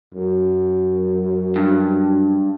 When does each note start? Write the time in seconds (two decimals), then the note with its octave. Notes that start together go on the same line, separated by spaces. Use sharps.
0.14 F#2
1.56 G2